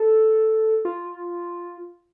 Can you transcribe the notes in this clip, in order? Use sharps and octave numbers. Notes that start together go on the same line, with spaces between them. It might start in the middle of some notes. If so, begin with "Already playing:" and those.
Already playing: A4
F4